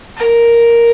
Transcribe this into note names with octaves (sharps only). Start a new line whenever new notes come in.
A#4